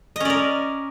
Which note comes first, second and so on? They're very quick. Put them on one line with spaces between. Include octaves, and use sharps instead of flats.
D#5 C#4 D5 A#4